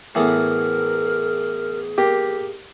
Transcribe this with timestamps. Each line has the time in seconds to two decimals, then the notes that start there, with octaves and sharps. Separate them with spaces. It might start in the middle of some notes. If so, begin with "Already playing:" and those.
0.15 A2 E3 B3 G#4 A#4
1.98 A#3 G4